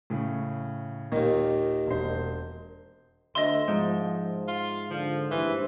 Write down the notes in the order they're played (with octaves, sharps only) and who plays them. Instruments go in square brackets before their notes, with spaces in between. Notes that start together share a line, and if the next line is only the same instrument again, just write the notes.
[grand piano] A2 C#3
[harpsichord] D#2 D#3 [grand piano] A#2
[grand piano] E1 C5
[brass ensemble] D2 [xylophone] D#5 C6 [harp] E5
[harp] G#2 [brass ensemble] F3
[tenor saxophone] F4
[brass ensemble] D3 [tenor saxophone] F3
[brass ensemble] A#1 G2 C5 [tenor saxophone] E3